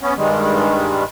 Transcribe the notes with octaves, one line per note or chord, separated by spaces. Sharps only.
B3 C#4
G2 D#3 G3 G#3